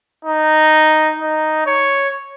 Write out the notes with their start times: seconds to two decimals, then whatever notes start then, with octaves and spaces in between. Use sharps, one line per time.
0.25 D#4
1.19 D#4
1.66 C#5